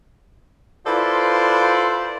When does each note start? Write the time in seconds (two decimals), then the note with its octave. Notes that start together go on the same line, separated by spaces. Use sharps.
0.86 E4 F4 A4 B4 C5 D5